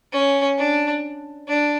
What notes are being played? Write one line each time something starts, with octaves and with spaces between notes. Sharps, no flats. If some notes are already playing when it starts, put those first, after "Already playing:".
C#4
D4
D4